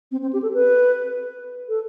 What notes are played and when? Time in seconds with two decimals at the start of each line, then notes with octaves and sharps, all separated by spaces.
0.12 C4
0.22 C4
0.33 G4
0.42 A4
0.54 B4
1.69 A4